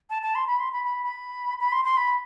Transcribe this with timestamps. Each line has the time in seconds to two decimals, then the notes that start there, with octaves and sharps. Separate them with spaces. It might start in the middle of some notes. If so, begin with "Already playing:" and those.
0.10 A5
0.22 A5
0.35 C6
0.47 B5
0.60 C6
0.72 B5
0.84 B5
1.03 B5
1.59 B5
1.72 C6
1.85 C6
1.97 B5